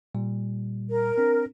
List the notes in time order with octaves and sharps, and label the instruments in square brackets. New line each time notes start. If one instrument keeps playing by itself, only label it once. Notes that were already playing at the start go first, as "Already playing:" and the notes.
[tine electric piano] A#2 G3
[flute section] A#4
[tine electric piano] C4 D4